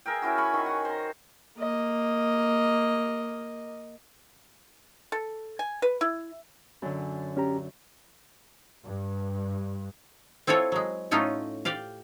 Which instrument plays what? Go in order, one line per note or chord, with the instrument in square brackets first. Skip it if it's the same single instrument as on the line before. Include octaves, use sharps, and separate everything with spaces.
[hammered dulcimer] G#4 A#4 E5 G5
C#4 E4 F#4
G#5 B5 C#6
D#3
F#5
C5 A#5
[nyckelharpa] A#3 D#5
[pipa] A4
G#5
B4
E4
[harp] F#2 D3
[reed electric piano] C#4 G4 A#5
[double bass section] G2
[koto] C4 E4 F4 A4 C#5
F#3 G#3
A2 A3 C#4 D#4 F4
G4 D5 F5